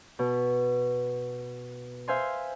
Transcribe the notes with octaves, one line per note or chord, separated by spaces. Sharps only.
B2
C5 E5 F5 G#5 C6